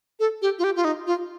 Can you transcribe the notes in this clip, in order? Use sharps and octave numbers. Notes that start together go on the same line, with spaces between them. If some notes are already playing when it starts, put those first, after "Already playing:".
A4
G4
F4
G4
F4
D#4
F4